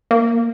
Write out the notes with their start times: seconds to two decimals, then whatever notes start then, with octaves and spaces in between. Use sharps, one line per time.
0.11 A#3